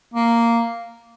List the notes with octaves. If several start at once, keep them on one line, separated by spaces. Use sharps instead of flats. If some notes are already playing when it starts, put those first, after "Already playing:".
A#3